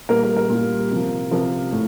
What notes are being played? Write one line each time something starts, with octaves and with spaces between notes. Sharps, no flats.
A#2 G3 A#4
A#4
A#4
A#2 G3
C3 F3
C3 F3 A#4
A2